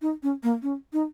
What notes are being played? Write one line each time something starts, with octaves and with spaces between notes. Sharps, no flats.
D#4
C#4
A#3
C#4
D#4